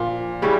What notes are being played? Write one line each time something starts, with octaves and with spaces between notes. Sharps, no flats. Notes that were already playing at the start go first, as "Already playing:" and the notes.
Already playing: A#2 F3 D4
C#3 G3 C#4 E4